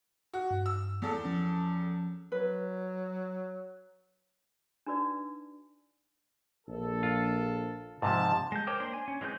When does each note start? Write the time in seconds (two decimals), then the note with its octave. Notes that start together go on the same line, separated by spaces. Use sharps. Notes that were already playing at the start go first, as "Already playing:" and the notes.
0.33 F#4
0.51 G2
0.66 E6
1.02 E2 A4
1.24 F3 C#4
2.32 F#3 B4
4.86 D4 D#4 F#4 B4 D5
6.67 A#1 A4
7.03 F4
8.02 G#2 C3 F3 A5
8.52 G#3 G6
8.67 A#4 C5 C#5 G5 D6
8.80 A#3 D4 C5
8.93 G#5
9.08 C#4
9.21 E3 G#3 C4 G#4 G6